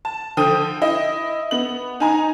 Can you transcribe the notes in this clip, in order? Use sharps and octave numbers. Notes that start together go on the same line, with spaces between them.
A5
D3 F3 G5 D#6 D#7
E4 D#5
B3 F#7
D#4 G#5 A#5